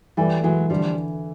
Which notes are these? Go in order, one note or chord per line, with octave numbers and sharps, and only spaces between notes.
E3 G3 A3
E3 F#3 G#3
D3 F3 G3